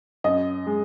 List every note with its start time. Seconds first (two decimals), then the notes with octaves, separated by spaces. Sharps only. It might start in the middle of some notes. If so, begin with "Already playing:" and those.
0.24 F#2 D#5
0.67 G#3